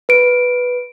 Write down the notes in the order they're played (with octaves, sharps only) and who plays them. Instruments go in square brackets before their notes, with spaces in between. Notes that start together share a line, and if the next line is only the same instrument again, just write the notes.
[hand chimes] B4 D7